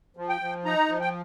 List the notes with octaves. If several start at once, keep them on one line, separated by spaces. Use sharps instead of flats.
F3
G5
F3
D#4 A#5
F3
G5